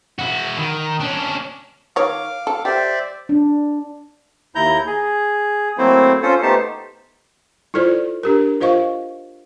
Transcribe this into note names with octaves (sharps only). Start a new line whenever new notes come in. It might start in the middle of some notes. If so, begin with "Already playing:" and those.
E4 F#4
D#3
C#4 D4
D#3 C#5 F5 D6
A4
G4 C5 D5 E5
D4
D#2 E4 A#5 G6
G#4
F#3 A3 A#3 C4 E4 C5
C#4 F4 A4 C5
A3 B3 D#4 G4 C5 A5
E4 F4 A4 C5 D5
D4 G4 A#4
F4 C5 D#5 F5 C#6